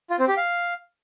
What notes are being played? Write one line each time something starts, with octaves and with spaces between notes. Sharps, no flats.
F4
C4
G4
F5